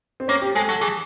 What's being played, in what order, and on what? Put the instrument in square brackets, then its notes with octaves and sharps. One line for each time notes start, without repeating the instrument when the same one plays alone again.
[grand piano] C4
[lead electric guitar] A#3 [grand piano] C#4
[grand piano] G4
[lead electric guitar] G#3 [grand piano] A4
[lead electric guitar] F#3 [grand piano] A4
[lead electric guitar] E3 [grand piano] G#4